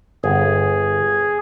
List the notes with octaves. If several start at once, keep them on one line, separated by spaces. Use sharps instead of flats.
G1 G#4